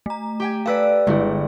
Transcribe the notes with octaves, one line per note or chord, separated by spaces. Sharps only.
A3 A#5
G4 G5 G#5
A4 B4 D5 F5 E6
G1 G#3 E4 G#4